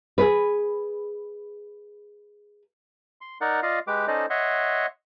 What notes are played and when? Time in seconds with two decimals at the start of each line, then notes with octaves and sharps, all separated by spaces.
0.18 G#4 B4
3.21 C6
3.41 D#4 A#4 D5 F#5
3.63 F4 D5 D#5 F5
3.87 G#3 G4 B4 D6
4.08 C#4 D#4 A4 C5 D5 D#5
4.30 C#5 D#5 E5 F#5 C6